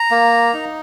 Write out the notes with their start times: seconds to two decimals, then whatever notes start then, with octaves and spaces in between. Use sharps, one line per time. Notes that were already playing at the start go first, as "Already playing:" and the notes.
Already playing: A#5
0.11 A#3
0.54 D#4